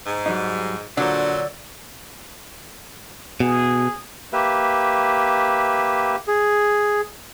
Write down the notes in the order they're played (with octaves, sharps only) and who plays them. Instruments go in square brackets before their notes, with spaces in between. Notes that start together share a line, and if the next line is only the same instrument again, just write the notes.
[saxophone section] G#2
[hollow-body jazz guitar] F#3 G3 D#4
[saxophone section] A#2 F#3 [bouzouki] D3 [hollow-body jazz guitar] D4 C5
[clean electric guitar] B2 [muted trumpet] G#4
[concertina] A#3 G4 B4 E5
G#4